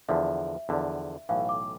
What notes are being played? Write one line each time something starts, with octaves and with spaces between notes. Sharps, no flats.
E2 D3 F3 E5
E2 D3 F3
B1 A2 E3 F5
D6